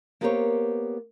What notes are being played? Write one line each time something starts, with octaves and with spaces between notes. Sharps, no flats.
A#3 B3 G4 A#4 C5 C#5